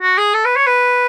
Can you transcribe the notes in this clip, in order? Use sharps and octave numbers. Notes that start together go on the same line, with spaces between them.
F#4
G#4
A4
B4
C#5
B4